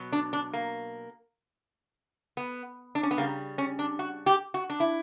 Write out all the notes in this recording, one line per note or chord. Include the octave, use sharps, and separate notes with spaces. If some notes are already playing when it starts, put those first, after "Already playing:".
Already playing: B2 F#3
D4
D4
A#3
B3
D4
C#4
B3
C#3 G3 A#3
C#4
D4
F#4
G4
F#4
D4
E4